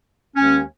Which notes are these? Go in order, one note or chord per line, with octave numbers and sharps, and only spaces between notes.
D#2 D#3 G#3 C#4